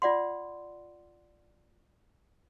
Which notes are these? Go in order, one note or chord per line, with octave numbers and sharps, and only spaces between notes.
F4 D5 F#5 C6